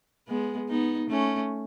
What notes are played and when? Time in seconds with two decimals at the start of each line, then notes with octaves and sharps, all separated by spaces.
0.28 G#3 B3
0.69 B3 D#4
1.10 A3 C#4